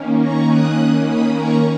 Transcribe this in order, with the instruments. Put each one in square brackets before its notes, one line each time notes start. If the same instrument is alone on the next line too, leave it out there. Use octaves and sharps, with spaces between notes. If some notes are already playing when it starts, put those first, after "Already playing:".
Already playing: [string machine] D#3 A#3 C#4
A#5 C#6
D#6 F#6
B5 D#6
A#5 C#6